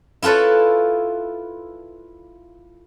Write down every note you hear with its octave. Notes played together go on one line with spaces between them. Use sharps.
E4 F4 A4 B4 C#5